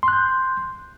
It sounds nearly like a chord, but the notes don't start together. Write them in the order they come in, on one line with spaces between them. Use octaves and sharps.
C6 F#6 G6